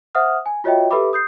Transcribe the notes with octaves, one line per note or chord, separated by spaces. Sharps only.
C5 E5 F#5 D#6 F6
G#5
F4 F#4 C#5 D#5 E5 G5
G4 A4 B4 E5 B5 D6
D#6 G6 C7